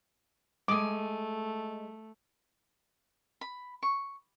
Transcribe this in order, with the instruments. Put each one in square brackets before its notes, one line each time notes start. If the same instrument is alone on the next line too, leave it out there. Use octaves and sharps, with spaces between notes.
[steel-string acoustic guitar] G#3 G#5 [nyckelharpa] A3 [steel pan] D6 D#6
[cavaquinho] B5
C#6